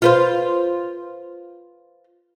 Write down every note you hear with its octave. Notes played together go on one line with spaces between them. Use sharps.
F4 B4 C5